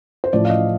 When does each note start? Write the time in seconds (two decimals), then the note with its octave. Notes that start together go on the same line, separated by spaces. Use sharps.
0.24 C5
0.33 A1 A2 F3 D5
0.45 F5
0.50 D#5